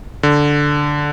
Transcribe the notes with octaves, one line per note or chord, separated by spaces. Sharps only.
D3